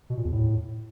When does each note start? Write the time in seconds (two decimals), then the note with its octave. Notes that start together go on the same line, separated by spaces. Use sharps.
0.10 B2
0.17 A#2
0.25 E2
0.32 A2